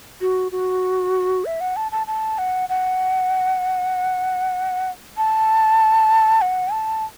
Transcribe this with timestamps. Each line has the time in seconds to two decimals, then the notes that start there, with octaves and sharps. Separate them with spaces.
0.21 F#4
0.52 F#4
1.45 E5
1.61 F#5
1.76 A5
1.92 A5
2.07 A5
2.38 F#5
2.69 F#5
5.17 A5
6.42 F#5
6.72 A5